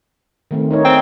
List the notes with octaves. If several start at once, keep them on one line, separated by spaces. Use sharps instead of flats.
D#3 A3 C4
D#4 A#4 C#5
C4 G5